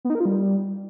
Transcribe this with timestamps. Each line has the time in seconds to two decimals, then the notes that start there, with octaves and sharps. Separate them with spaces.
0.05 B3
0.10 D#4
0.15 A#4
0.20 F4
0.25 G3